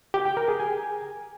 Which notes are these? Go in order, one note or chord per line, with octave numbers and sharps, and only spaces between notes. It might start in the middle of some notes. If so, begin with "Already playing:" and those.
G4
G5
A#4
G#4
G#5